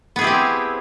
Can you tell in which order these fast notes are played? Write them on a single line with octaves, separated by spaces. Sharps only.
B3 G#4 E4 G4 C4